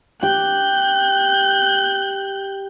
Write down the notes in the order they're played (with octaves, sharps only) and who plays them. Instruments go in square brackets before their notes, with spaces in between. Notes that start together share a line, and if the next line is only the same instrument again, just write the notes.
[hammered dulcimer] G4 [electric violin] F#6 G6